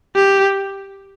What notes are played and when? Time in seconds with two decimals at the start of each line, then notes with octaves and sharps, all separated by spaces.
0.16 G4